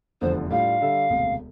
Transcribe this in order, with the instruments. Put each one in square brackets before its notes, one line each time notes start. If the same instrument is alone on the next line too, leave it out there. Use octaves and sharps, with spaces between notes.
[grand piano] F1 E2 D3 F3 [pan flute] C5
[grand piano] A2 G3 D4 F4 [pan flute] F5
[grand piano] D3 G3 D4 A4 E5
E1 D2 C3